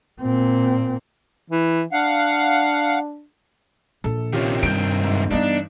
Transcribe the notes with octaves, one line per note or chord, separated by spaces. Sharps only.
A#2 C4
E3
D4 F5 F#5
A#1 A4
C3 D#3 C#4 F4 G4
G2 G6 D7
G#2
G2 E3 B3 D4 D#4